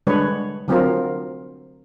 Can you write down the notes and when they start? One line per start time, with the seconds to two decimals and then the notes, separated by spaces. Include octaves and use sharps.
0.07 D3 G3 G#3 D4 B4 C#5
0.68 D3 F#3 C4 F4 A#4